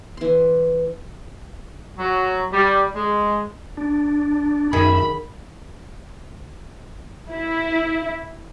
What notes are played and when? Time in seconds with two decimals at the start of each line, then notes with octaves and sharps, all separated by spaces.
0.17 E3 C6
1.98 F#3
2.53 G3
2.95 G#3
3.77 D4
4.73 F#2 D#3 G#4 E5 B5
7.32 E4